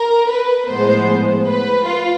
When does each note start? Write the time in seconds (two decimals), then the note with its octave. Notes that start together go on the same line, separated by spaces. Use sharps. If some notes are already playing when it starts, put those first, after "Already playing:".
Already playing: A#4
0.29 B4
0.68 A2 F3 G#3 B3 C5
1.48 B4
1.87 F4